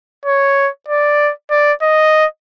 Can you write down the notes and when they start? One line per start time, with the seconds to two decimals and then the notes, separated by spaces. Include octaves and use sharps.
0.25 C#5
0.88 D5
1.50 D5
1.82 D#5